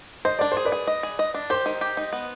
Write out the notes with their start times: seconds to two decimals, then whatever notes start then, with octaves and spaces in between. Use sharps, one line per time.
0.25 C5 D#5
0.39 D4 D5
0.52 C5
0.57 G#4
0.65 B4 D5
0.72 G#4
0.87 D#5
1.03 G#4
1.19 D#5
1.34 D4
1.50 G4 C5
1.66 D#3
1.81 G4
1.97 D#4
2.13 B3